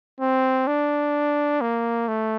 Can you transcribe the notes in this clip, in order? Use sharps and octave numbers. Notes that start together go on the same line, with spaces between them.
C4
D4
A#3
A3